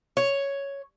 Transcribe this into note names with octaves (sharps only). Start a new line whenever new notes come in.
C#5